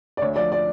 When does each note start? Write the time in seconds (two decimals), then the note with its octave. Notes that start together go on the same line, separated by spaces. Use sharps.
0.17 D5
0.21 D2 C#5
0.36 F3 D5
0.52 D5